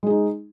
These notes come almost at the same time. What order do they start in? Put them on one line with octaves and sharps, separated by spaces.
G#3 G#4 D#4